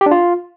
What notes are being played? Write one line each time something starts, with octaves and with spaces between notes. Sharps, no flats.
G4
D4
F4